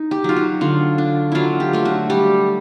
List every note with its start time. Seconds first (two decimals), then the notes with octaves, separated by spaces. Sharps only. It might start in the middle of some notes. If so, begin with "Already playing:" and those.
Already playing: D#4
0.11 G4
0.24 F#3 F4
0.36 F#4
0.61 D3 F4
0.98 D4
1.32 F#3 E4 F4
1.60 G4
1.73 A3 F4
1.85 F#4
2.10 G3 G4